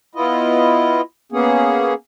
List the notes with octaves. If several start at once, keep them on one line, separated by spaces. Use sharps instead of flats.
B3 E4 F4 D#5
A#3 B3 C#4 G#4